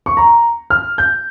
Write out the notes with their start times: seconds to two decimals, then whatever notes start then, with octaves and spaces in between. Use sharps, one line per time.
0.06 C#6
0.17 A#5
0.70 F6
0.98 G6